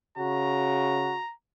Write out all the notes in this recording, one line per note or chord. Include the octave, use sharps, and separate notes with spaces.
C#3 F#4 A#5